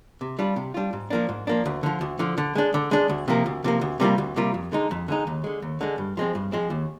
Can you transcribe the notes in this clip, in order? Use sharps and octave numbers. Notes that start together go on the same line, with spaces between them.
C3
G3 D4 F4
C3
G3 D4 F4
G#2
F3 A#3 D4
G#2
F3 A#3 D4
D2
D3 F3
D2
D3 F3
D3
G#3 D4
D3
G#3 D4
D2
C3 F3 A#3
D2
C3 F3 A#3
D2
C3 G3 A#3 F4
D2
C3 G3 A#3 F4
F2
D3 G#3 D#4
F2
D3 G#3 D#4
D#2
D3 G#3
D#2
D3 G#3
G2
F3 G#3 C4
G2
F3 G#3 C4
D#2